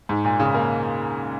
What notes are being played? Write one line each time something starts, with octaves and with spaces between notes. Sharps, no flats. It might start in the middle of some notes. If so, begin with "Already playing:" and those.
G#2
A#2
C#3
A#3